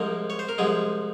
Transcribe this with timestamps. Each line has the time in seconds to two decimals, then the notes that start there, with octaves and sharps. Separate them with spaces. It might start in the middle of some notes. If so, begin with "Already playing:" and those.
Already playing: C2 C3 F3 G#3 A#3 A#4
0.30 C#5
0.39 C5
0.49 A#4
0.58 C2 C3 F3 G#3 G#4